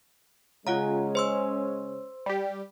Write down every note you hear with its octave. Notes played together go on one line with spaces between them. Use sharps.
C#3 G#3 C#4 F4 F#5 A#5
C5 C6 E6
G3 G4